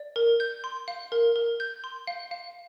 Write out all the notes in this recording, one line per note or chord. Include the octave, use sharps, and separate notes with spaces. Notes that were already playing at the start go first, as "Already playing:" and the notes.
Already playing: D5
A#4
G6
C6
F5
A#4
A#4
G6
C6
F5
F5